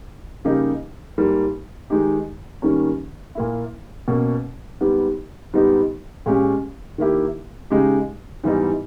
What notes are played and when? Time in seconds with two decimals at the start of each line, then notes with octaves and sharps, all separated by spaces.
0.45 C#3 G3 A#3 D#4 G4
1.18 G#2 G3 A#3
1.90 D#3 G#3 D#4 G4
2.62 G#2 D#3 G3 A#3 C#4
3.35 A#2 A#3 E4
4.08 B2 A#3 C#4
4.81 G#2 G3 B3 G4
5.53 G#2 G3 B3 D#4 G4
6.26 A#2 G#3 C#4 G4
6.98 D#3 A#3 E4 G4
7.71 C#3 G#3 D#4 G4
8.44 G#2 E3 G3 B3 D#4